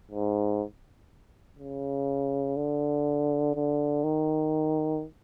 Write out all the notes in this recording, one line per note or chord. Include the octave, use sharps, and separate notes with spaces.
G#2
C#3
D3
D3
D#3